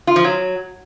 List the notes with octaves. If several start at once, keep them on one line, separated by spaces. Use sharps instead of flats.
F4
F3
F#3